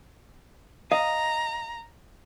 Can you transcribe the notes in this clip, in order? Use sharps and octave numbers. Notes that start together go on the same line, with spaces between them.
D#5 F5 A#5